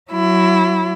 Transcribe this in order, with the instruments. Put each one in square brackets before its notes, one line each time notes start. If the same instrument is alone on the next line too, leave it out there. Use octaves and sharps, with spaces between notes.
[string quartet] F#3 E4